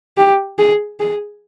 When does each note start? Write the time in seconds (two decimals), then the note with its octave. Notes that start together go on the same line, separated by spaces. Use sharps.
0.17 G4
0.59 G#4
1.00 G#4